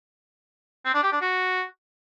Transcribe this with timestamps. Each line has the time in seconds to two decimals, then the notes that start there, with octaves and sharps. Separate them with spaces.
0.85 C4
0.94 D4
1.03 G4
1.12 D4
1.21 F#4